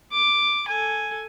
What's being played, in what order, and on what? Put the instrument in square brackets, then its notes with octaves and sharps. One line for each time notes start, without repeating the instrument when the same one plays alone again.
[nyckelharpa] D6
A4 G#5